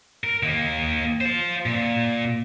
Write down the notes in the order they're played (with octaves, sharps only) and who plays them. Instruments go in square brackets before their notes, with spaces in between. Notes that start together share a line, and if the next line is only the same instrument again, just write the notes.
[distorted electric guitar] A#4
D#3 A#3
F4 C5
A#2